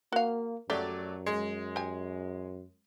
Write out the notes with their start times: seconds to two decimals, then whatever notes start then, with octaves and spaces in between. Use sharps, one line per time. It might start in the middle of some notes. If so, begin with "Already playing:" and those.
0.12 A#3 F#4 F5
0.70 F#2 F#3 A3 G4 D5
1.26 G#3
1.76 G4 G#5